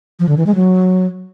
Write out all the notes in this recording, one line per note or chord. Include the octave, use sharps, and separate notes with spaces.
F3
D3
E3
G#3
F#3